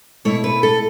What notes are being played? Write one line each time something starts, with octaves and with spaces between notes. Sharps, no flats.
B2 A3 E4 C#5
B4
A4